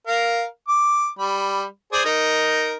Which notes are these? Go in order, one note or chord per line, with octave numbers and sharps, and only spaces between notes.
A#4 F5
D6
G3 B5
G#4 C5 D5
D#4 A#4